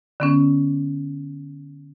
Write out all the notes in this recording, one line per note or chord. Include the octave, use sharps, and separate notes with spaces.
D3 B3 C#4